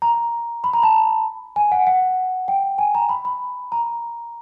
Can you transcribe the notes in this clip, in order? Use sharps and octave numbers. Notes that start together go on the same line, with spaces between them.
A#5
B5
A#5
A5
G#5
F#5
F#5
G5
G#5
A#5
B5
B5
A#5